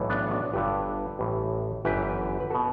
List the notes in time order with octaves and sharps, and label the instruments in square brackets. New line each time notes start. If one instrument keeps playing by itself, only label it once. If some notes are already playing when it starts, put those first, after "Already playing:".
Already playing: [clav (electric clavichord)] B1 A2 E3
B3 D4
D4 F#4
G1 G2 D3 G4 B4
A1 A2 E3
G1 F#2 E3 G4 B4
B4
B2 F#4 A4